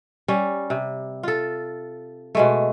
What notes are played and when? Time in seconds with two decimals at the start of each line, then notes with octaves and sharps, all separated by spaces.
0.28 G3 C#4
0.70 C3
1.23 F4 A4
2.35 B2 G#3 A3